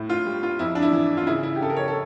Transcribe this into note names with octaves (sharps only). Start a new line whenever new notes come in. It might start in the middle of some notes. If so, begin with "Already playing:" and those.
Already playing: A2
F4
G3
F4
F2 E4
D4
E4
E3
F4
C#3 E4
E4
G4
C#3 A4
A#4
C#5
A4